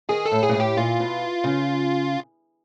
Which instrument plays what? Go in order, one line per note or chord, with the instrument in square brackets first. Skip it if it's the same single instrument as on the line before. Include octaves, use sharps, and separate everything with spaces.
[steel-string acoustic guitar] D#3 [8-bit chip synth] G#4
[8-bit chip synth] A4
[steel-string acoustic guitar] A2
[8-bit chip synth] G#4
[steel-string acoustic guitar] A#2
A2
[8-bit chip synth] G4
[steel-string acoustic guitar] A#2 [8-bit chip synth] F4
[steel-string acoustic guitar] B2
C#3